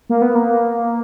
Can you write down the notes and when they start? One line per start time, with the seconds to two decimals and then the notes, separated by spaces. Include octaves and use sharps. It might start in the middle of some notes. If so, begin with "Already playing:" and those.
0.09 A#3
0.22 B3
0.35 A#3